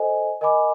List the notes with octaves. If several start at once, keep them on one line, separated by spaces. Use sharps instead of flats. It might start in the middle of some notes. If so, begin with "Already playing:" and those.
Already playing: A4 C5 D#5 G#5
A#4 D#5 G#5 B5 D6